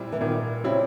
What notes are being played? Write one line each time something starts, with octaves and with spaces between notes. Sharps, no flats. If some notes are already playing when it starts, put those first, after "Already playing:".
Already playing: A#2 G3 C4 E4
E3
A#2 D#3
C#3 G3 C4 E4